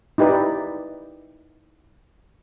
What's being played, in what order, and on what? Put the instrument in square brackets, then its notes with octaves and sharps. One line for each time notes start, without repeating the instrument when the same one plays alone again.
[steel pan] D#4 E4 G4 B4 D5